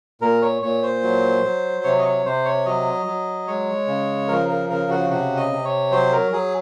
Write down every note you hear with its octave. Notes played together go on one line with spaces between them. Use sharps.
A#2 A#4
C#5
A#2 C#5
C5
F#3
F#3
C3 C#5
D#5
C#5
C3 C5
C#5
F#3 D#5
F#3
G#3 C#5
C#3
F3 A#4
A#4
C#3 A#4
F#4
C3 F#4
D#5
C3
C#5
F#3 C5
A#4
F#3 G#4